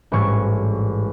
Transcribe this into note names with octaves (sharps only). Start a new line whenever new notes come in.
A1 G#2 G3 C#6 G#6